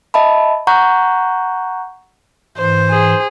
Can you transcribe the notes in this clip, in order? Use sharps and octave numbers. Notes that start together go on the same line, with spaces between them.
D#5 E5 A5 B5
F#5 A#5 C#6 F#6 G6
G#2 E3 C5
G#4